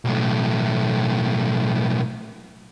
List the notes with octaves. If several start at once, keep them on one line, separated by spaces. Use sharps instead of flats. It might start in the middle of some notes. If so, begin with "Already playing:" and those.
B1 A2